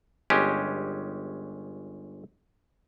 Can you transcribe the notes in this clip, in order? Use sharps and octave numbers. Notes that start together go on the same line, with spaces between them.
G1 G#3 C#4 G4